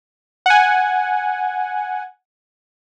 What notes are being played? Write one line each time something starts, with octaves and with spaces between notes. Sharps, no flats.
F#5 G#5